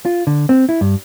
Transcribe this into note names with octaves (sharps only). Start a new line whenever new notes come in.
F4
D3
C4
E4
G2